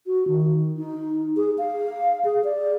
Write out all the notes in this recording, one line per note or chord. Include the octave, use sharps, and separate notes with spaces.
F#4
D#3
D#4
G#4
F5
G#4
D5